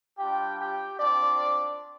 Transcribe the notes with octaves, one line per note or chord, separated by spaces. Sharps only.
G3 D4 F4 G4 G5
G4 G5
C4 D4 F4 D5